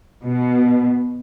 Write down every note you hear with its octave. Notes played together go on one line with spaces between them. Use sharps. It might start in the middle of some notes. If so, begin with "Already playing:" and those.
B2